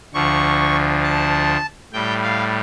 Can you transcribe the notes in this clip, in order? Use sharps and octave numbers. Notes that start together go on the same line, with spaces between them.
D2 D3 F3 C#6
A5
A2 G3 G5
F5